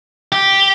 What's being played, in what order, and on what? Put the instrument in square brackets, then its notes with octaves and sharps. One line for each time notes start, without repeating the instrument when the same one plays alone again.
[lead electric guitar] G4